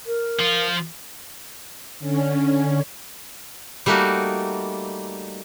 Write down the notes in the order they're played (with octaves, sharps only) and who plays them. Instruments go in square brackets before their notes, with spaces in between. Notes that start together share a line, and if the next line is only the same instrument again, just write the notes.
[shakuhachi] A#4
[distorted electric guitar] F3 F4
[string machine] D3 C#4
[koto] G3 A3 A#3 D#4 F#4